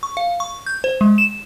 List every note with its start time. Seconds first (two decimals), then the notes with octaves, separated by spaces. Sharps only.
0.03 C#6
0.17 F5
0.40 C#6
0.66 G6
0.84 C5
1.01 G#3
1.18 E7